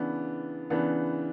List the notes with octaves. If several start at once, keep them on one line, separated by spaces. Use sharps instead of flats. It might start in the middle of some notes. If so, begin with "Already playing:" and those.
Already playing: C#3 E3 B3 D4
C#3 E3 B3 D4